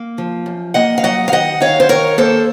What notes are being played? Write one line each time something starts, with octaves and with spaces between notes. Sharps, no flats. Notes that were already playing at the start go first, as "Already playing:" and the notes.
Already playing: A#3
F3
F#2
A#3 D#5 F#5
F5
F#3 D#5 F#5
F5
D#3 D#5 F#5
D#3 C#5 F5
C5
D#3 A#4 C#5
A#3 A4 C5